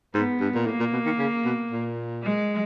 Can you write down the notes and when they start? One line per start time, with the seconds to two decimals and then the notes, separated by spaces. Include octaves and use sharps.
0.14 G#2 B3
0.40 G2
0.55 A#2
0.66 A2 A#3
0.80 A#2
0.93 B2
1.06 D#3
1.19 C#3
1.45 B2
1.71 A#2
2.23 G#3